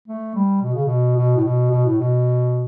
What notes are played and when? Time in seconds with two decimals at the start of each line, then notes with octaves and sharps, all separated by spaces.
0.08 A3
0.35 G3
0.62 B2
0.74 C#3
0.86 B2
1.16 B2
1.36 A2
1.44 B2
1.71 B2
1.85 A2
1.99 B2